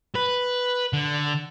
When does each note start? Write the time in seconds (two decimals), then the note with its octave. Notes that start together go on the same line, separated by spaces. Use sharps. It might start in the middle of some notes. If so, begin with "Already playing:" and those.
0.15 B4
0.93 D3